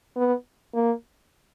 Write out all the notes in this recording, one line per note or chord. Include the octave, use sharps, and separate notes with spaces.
B3
A#3